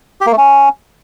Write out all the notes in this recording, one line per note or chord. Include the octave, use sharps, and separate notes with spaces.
G4
A#3
A3
C#4